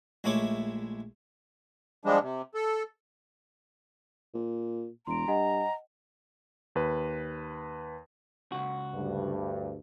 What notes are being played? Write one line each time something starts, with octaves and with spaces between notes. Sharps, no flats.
A#1 G#3 A3 E4 C#5 D6
F3 G3 G#3 D4
C3
A4
A#2
E1 A#5 C6 D7
G2 D#5 F#5 G#5
D#2 B4
C#2 F#4
D2 G2